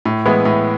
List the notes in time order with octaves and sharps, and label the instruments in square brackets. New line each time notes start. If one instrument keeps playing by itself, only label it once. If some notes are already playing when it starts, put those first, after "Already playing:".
[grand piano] A2
E3 G#3 B3 E4
A2